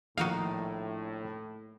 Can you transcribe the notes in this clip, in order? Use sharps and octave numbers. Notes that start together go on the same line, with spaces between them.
A#1 A2 D#3 A#3 D#4 F#4 F5